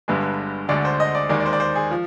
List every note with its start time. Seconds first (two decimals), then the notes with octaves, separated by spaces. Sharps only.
0.08 G1 G2 D3 G#3 B4
0.69 D2 D3 G#3 D5
0.85 C5
1.00 D#5
1.15 D5
1.29 D#2 D#3 G#3 D5
1.40 D5
1.46 C5
1.53 D5
1.60 C5
1.75 G#4
1.91 F3